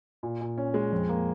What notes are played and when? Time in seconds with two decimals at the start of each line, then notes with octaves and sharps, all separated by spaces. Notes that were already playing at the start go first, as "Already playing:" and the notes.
0.23 A#2
0.41 A#2
0.58 C#4
0.74 G#3
0.92 F2
1.09 A#3